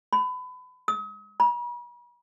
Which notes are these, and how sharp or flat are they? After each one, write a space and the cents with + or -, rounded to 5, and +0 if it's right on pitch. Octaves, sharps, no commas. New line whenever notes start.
B5 +30
D#6 +40
B5 -45